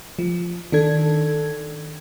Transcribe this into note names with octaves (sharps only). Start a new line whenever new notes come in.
F3
D#3 D4 A4 G#6